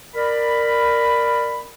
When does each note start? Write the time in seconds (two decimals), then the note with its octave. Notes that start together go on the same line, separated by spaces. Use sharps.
0.15 A#4 D5 B5